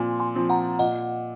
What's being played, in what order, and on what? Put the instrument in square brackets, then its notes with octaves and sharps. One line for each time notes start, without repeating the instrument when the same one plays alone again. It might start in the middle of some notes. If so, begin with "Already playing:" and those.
Already playing: [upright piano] A#2 F3 C4 [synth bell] G#5 C6
[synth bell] G#5 C6
[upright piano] F3 C4
[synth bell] F#5 A#5
[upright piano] A#2 [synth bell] D#5 F#5